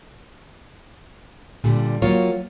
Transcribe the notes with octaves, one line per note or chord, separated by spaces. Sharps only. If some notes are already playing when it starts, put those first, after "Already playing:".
A#2 D3 G3
F#3 A#3 F4 C#5